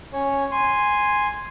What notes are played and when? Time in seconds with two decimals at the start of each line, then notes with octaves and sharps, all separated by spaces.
0.13 C#4 C#5
0.51 G#5 C6